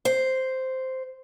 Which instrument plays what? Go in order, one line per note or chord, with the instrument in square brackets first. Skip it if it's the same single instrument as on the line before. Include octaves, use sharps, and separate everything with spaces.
[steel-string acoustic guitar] C5